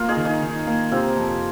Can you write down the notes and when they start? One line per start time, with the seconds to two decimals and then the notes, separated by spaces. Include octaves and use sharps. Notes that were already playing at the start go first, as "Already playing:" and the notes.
Already playing: A#3 F4 A#4
0.09 D#4 G#4
0.17 D#3
0.25 D#4 G#4
0.42 D#3
0.67 A#3
0.91 C3 C4 F4
1.17 F2